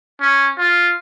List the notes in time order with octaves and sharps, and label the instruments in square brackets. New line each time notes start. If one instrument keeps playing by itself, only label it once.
[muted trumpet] C#4
F4